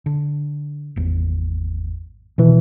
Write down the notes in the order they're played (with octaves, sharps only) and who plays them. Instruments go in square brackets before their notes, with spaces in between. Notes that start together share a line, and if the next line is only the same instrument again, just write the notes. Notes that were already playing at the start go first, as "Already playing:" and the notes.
[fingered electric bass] D3
G#1 E2
[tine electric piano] B2 E3 [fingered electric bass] D#3